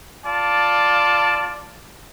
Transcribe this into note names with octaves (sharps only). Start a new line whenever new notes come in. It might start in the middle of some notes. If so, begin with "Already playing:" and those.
F4 D5 A5